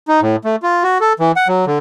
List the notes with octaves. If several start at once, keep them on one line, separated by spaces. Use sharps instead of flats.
D#4
A2
A3
F4
F#4
A4
E3
F#5
F#3
D3